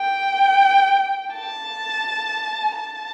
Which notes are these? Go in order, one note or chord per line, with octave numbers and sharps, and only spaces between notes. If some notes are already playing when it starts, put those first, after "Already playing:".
Already playing: G5
A5
A5